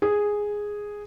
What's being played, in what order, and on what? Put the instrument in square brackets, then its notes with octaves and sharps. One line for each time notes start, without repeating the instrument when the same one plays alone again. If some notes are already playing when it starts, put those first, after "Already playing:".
[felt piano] G#4